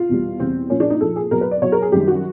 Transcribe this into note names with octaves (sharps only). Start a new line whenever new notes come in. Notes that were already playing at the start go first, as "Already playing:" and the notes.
Already playing: F4
E2 B2 G3
E2 B2 G3 C4
A#2 F3 C#4
D4
D#4
A#2 F3 A4
G#4
B2 F#3 A#4
B4
D5
B2 F#3 C#5
A#4
G#4
F#2 D#3 G3 G4
F#4